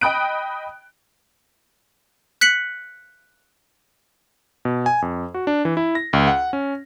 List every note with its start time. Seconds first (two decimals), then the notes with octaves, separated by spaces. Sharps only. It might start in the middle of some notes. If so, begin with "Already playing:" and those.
0.01 D#5 G5 B5 D#6 F#6 D7
2.41 F#6 B6 C#7 F#7
4.65 B2
4.86 G#5
5.02 F2
5.34 F#4
5.47 D4
5.65 E3
5.77 E4
5.95 A#6
6.13 C#2
6.27 F#5
6.53 C#4